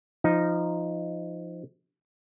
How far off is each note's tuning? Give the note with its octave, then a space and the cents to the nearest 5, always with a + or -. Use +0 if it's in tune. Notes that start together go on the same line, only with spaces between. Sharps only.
F3 -15 D#4 +0